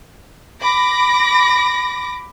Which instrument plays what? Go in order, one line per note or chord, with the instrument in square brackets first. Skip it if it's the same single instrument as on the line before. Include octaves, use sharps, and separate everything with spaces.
[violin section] B5 D6 A#6